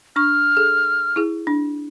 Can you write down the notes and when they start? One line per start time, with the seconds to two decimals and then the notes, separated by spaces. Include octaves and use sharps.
0.16 D4 C#6 F6
0.57 G#4 A4
1.16 E4 G#4
1.47 D4